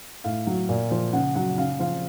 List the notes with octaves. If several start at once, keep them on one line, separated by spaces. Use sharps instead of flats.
A2 F5
F#3
A#2
F3
C#3 F#5
F#3 F#5
C#3 F5
F3 F5